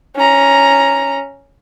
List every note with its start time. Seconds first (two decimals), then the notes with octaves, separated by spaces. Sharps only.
0.16 C#4 A#5